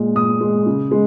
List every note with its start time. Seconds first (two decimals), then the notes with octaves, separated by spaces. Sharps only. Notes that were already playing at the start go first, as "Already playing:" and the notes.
Already playing: A#2 G#3
0.15 A#2 D#6
0.41 G#3
0.66 C#3
0.91 G#3